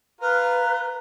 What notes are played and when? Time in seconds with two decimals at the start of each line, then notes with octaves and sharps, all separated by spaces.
0.21 F4 A#4 B4